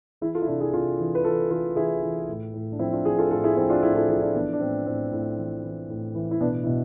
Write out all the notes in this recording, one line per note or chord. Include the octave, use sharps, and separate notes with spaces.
E3 E4 G#4
F4 A4
E4
C3 D4 F4
E4 G#4
C3 F4 A4
E3
B4
E3 F4 A4
E3 F4 A4
E3 E4 G#4
E3
A2
A2
D4
F3 C4 E4
D4 F4
F3 E4 G#4
F4 A4
A2 F4 A4
E4 G#4
F3 C4 E4
D4 F4
A2 E4 G#4
F4 A4
F3 E4 G#4
D4 F4
E3 B3 D4
D4
A2 C4
A2 C4
A2
E3
E3
A2
E3
E4
B2 B3 D4
B2 E4